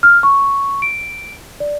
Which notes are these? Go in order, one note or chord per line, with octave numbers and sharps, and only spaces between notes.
F6
C#6
D7
D5